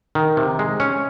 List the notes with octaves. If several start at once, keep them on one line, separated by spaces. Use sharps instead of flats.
D#3
C3
G#3
C#4